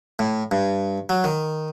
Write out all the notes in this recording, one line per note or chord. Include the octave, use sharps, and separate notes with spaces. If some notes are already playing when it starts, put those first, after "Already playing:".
A2
G2
F#3
D#3